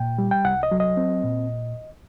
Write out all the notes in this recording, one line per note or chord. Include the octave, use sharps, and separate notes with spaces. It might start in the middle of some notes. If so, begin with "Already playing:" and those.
Already playing: A#2 G5
G3
G5
C2 F#5
D#5
F#3
D#5
C4
A#2